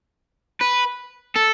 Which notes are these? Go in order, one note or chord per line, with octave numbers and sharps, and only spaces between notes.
B4
A4